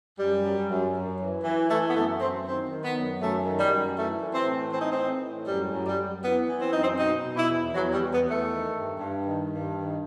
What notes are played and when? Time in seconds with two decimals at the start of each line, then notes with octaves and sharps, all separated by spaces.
0.18 F#2 G3
0.43 F#2
0.69 F#2
0.94 F#2
1.19 E3
1.44 E3
1.69 E3 A3
1.88 B3
1.94 F#2 A3
2.19 F#2 C4
2.45 D#3 C4
2.70 D#3
2.82 B3
2.95 F#2
3.20 F#2 A3
3.45 D#3
3.57 G3
3.71 F#2
3.95 E3 A3
4.21 E3
4.33 C4
4.46 A2
4.71 E3 C4
4.80 D#4
4.90 C4
4.97 E3
5.22 A2
5.46 F#2 G3
5.71 F#2
5.85 G3
5.97 F#2
6.22 E3 B3
6.47 E3
6.60 C4
6.70 F#2 D#4
6.81 C4
6.98 B2 D#4
7.23 B2
7.36 E4
7.48 E2
7.73 E2 F#3
7.92 G3
7.99 E2
8.11 B3
8.24 E2
8.30 A3
8.50 D#3
8.75 G2
8.99 G2
9.24 D#3
9.50 G2
9.75 D#3